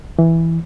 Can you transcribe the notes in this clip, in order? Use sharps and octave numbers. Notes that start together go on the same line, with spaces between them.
E3